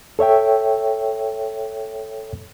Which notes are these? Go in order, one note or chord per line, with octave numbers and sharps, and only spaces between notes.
A4 C#5 E5 G5